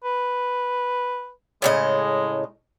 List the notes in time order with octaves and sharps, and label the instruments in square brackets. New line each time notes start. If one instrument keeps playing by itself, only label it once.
[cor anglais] B4
[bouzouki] A2 C#3 D#5 [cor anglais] G#3